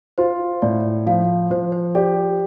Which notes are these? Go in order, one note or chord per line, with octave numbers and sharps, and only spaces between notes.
F4 C5
A2 D5
F3 F5
F3 C5
C5
G4 D5